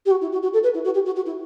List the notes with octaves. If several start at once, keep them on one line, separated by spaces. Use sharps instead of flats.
G4
F#4
E4
F#4
F#4
A4
B4
E4
F#4
G4
F#4
F#4
E4